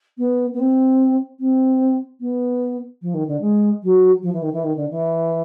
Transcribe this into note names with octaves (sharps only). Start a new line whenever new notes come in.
B3
B3
C4
C4
B3
F3
D#3
D3
G#3
F#3
F3
E3
D#3
E3
D#3
D3
E3